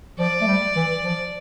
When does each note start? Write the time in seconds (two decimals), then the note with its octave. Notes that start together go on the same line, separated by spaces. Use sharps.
0.19 F3 D5
0.41 A3
0.47 G3
0.76 E3
1.05 F3